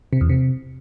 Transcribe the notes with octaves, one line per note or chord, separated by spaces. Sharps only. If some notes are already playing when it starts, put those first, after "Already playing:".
C3
E2
C3